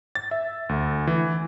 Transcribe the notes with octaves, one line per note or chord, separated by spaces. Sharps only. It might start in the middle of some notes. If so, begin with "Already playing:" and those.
A6
E5
D2
E3